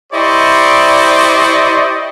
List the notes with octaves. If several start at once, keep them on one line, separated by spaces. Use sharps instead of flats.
E4 G4 C5 D5 D#5 C#6